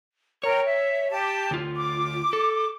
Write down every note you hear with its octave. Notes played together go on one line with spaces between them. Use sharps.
A#4 C#5 G5
E5
G4 A5
D2 F4
D6
A4